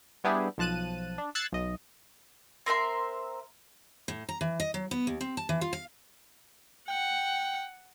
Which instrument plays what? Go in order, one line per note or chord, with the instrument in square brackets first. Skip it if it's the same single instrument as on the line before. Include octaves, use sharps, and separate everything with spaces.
[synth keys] G3 B3 D4 E4 G4 G#4
B1 F3 A5 F#6 D#7
D4
E6 F#6 G#6 A6 C7 C#7
B1 D#5
[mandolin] C4 A#4 E5 C6
[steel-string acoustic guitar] A2
A#5
E3
D#5
F#3
B3
D#2
C4
A5
E3
F4
F5
[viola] F#5 [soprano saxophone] G5